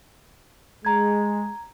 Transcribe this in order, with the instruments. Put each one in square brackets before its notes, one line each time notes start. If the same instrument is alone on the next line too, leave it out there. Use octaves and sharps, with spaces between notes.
[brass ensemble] G#3 [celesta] A#5 G#6